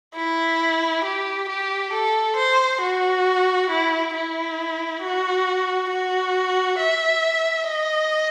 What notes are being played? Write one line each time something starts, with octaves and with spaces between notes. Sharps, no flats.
E4
G4
G4
A4
C5
F#4
E4
E4
F#4
F#4
E5
D#5